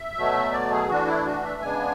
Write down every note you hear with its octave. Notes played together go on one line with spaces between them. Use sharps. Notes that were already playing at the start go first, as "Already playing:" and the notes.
Already playing: E5
B2 F#3 A3
D5
G#4
E3 A3 D4 F#4
E4
F#4
E5
C#3 G#3 B3 D4 G#5